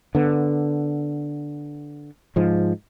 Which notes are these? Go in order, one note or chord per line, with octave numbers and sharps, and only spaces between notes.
D3 B3
G#2 F3 G#3